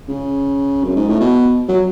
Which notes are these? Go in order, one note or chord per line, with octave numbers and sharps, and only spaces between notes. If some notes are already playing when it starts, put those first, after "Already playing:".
C#3
F#2
G#2
A2
B2
F#3